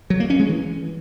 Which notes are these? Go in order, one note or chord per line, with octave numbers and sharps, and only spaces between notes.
F#3
A#3
C#4
G#3
E3